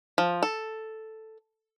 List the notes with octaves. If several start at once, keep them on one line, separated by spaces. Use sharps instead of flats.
F3
A4